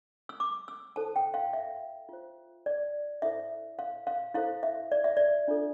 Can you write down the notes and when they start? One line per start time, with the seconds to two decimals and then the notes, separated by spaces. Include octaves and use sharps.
0.29 E6
0.40 D6
0.68 E6
0.96 E4 A4 C5 A5
1.16 G5
1.34 F5
1.53 E5
2.09 F4 C5
2.66 D5
3.22 E4 A4 C5 E5
3.79 F5
4.07 F5
4.34 E4 A4 C5 F5
4.63 E5
4.92 D5
5.04 E5
5.17 D5
5.48 D4 F4 A4